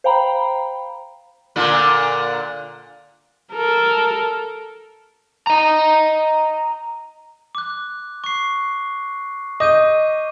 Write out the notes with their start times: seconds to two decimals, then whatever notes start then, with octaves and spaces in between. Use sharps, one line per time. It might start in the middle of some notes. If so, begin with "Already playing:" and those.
0.04 C5 F5 G5 A#5 B5
1.56 A#2 D3
3.53 A4 A#4
5.47 D#5 A#5
7.55 D6 F#6
8.24 C#6 C7
9.60 D#5 D6 G6 D#7